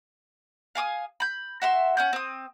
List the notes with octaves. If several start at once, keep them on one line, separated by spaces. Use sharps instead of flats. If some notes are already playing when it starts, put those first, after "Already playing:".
F5 G#5 D6 D#6
B5 G6
F#4 E5 C6
C#4 F#5 G6
C4 D#6